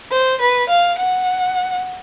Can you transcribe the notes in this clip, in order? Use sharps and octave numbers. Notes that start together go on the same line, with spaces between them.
C5
B4
F5
F#5